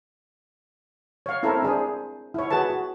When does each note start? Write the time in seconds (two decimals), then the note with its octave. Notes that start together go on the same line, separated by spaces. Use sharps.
1.26 C#5 F5
1.43 C4 E4 A4 A#4 C5
1.63 D4 G#4 C5
2.34 E4 C#5
2.50 F#4 G#4 B4 A5
2.70 F#4